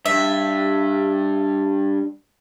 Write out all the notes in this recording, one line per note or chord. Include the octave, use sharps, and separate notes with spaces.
G2 E5